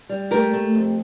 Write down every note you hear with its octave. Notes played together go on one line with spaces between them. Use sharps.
G3
A3 G4 A#4
A3
F2